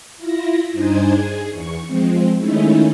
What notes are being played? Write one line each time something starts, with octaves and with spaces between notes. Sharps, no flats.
E4 F4 A#6
G2 D4 D#4 C5 G#5 G#6
G#4
E2 C#6
F3 G#3 C4
D#3 G#3 A3 C#4 D#4 E4